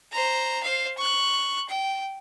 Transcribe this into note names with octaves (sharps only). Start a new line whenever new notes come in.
C5 A#5
C5 F5
C#6 F#6
G5